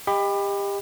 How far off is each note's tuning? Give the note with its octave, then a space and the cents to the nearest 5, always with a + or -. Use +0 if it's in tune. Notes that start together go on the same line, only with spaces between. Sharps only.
G4 +30 D#5 +0 B5 +10